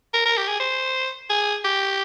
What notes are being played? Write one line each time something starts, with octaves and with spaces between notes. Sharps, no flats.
A#4
A#4
G4
G#4
C5
G#4
G4